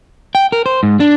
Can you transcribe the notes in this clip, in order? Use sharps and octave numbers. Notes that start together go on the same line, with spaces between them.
G5
A#4
C5
G#2
D4